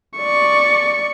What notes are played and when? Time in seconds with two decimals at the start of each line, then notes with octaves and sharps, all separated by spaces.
0.18 D5 C#6